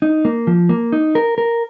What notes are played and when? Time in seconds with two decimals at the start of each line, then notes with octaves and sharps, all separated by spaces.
0.02 D#4
0.25 A#3
0.47 F3
0.69 A#3
0.92 D#4
1.15 A#4
1.38 A#4